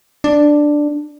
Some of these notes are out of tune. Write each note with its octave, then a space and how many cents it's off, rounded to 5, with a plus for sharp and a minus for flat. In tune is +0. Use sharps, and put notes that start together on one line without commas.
D4 +5